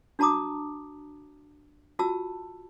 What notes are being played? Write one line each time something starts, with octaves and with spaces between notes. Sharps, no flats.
D4 F#4 A5 A#5 D6 D#6
F4 F#4 A5 E6